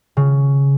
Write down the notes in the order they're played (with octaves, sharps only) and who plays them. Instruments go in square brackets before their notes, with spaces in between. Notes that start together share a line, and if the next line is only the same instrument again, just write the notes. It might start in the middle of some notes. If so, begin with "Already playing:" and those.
[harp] C#3